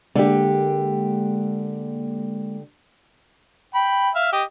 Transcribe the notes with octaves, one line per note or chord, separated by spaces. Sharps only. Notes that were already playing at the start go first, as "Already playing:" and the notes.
D3 G#3 A#3 G4
G5 B5
E5 F5
G4 D#5